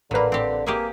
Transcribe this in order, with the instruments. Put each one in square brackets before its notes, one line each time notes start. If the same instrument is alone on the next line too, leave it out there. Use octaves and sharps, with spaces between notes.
[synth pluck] A1 B4 [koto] A#2 A#3 [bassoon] D3
[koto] C4 G4
[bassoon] A#3 [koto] G4 G#4 E5